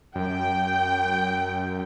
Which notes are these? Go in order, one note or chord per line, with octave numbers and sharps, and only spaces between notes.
F#2 G5